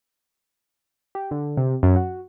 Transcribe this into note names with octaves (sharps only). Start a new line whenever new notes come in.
G4
D3
C3
F#2
F#4